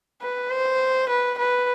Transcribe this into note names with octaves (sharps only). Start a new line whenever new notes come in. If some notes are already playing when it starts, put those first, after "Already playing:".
B4
C5
B4
B4